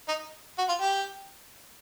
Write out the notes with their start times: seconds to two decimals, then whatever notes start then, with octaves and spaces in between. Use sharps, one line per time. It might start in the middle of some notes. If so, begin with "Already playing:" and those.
0.08 D#4
0.58 F#4
0.69 F4
0.81 G4